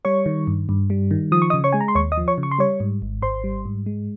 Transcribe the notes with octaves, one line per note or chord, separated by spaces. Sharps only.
G3 C#5 C#6
D#3
G2
G2
G3
D#3
F3 D#6
C#6
D#5 D#6
C#3
C#5 C#6
G#3 G#5
A#5
C6
D#2 C#5 C#6
D#5 D#6
F3
C#5 C#6
C#3
C#6
C6
G3 C#5 C#6
G#2
G#1
G#1 C5 C6
G3
G#2
G#3